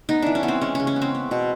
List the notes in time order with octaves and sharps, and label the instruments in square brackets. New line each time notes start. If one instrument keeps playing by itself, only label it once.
[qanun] B3 D#4
E3 D4
C#4
E3 B3
C4
G#3 C#4
C#3 C#4
C#4
B3
C4
B3
B2